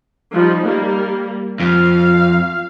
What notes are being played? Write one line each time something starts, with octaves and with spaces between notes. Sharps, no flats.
F3 G3 D#4
G3 A#3
F2 F5